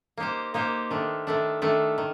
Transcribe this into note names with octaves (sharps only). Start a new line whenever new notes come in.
A#3 D#4 G4 C5
A#3 D#4 G4 C5
D#3 A3 D4
D#3 A3 D4
D#3 A3 D4
D#3